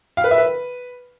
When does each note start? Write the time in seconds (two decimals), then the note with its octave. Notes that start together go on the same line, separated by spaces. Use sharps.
0.17 F5
0.24 B4
0.31 E5
0.38 B4